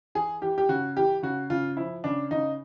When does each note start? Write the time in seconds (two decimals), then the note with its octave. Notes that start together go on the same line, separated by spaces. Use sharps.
0.15 E3 G#4
0.42 E3 G4
0.58 G4
0.69 C#3 F#4
0.96 E3 G4
1.23 C#3 F#4
1.50 C#3 F4
1.77 F3 E4
2.04 C#3 D4
2.31 C#3 D#4